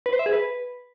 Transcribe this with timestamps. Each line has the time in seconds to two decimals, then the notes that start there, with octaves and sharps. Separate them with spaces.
0.06 B4
0.13 C5
0.19 E5
0.26 G#4
0.33 B4